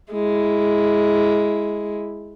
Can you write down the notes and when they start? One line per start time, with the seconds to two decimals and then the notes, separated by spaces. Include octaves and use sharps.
0.12 G#3 E4